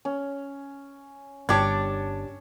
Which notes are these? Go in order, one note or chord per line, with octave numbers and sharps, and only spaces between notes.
C#4
G1 D4 G4 C#5 A5 C#6 D6 G#6